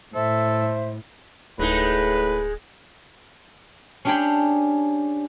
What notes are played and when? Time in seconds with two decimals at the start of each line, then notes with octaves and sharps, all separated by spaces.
0.15 A2 A4 C5 E5
1.59 D1 A2 G#3 D#4 B4
4.05 C#4 D4 G4 G#4 G5 B5